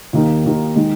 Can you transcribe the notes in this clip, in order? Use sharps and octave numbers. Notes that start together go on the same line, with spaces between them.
D#2 D#3 A#3 D#4
D#2 D#3 A#3 D#4
D#3 G#3